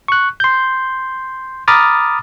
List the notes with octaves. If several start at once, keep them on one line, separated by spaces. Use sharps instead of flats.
C#6 F#6
C6 G6
A#5 B5 D6 D#6 F6 A6